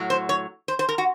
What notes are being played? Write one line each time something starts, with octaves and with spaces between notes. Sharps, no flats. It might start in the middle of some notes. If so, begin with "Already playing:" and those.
Already playing: A2 F#3
C5
C#5
C5
C5
A#4
F#4